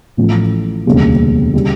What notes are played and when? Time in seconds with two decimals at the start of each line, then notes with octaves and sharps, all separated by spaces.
0.17 A1 A2 F3
0.86 E1 D2 C#3 G3 A#3
1.53 C#3 G3